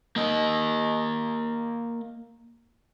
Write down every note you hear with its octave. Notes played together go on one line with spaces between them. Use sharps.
A#3 D#5